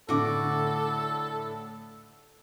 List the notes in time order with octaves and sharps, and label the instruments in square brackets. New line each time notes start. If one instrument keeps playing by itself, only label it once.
[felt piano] A2 D3 [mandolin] F#4 D6 [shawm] A4